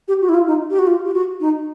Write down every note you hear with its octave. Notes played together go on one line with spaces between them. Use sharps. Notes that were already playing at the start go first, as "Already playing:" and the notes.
G4
F#4
E4
F4
D#4
G4
F#4
F4
G4
F#4
D#4